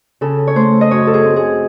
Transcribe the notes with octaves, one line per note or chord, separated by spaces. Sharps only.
C#3 A4
C#5
A3 C5
D#5
F#2 C#5
A4
G#4
C4
G#4